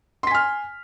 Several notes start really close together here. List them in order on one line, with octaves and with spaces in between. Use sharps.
C6 B6 G#5 F6